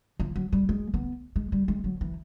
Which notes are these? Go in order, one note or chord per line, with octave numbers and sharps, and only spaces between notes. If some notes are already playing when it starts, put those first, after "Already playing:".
F3
F#3
G3
G#3
B3
G#3
G3
G#3
F#3
E3